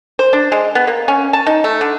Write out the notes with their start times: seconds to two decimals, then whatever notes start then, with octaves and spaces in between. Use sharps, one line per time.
0.19 C5
0.33 D4
0.52 G#3
0.75 B3
0.87 A#3
1.08 C#4
1.33 A5
1.47 D#4
1.64 A3
1.81 D3